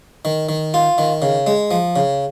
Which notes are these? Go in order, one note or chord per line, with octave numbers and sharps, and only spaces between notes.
D#3
D#3
F4
D#3
C#3
G#3
F3
C#3